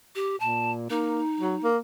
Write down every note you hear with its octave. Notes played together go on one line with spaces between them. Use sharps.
G4
A#2 A5
A#3 D#4
F#3
A#3